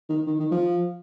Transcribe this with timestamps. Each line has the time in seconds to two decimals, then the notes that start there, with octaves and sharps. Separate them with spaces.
0.10 D#3
0.27 D#3
0.39 D#3
0.51 F3